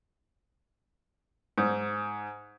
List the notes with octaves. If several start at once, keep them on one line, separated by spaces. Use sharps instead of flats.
G#2